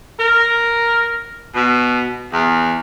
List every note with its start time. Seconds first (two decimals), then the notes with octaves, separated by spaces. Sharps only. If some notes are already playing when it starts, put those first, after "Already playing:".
0.20 A#4
1.55 B2
2.33 E2